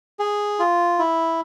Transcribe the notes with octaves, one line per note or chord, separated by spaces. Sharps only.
G#4
F4
E4